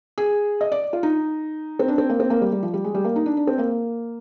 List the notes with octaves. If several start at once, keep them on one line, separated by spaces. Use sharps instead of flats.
G#4
D#5
D5
F4
D#4
C4
D4
C4
A#3
C4
A#3
G3
G3
F3
G3
G#3
G3
A#3
D#4
D4
D4
C4
A#3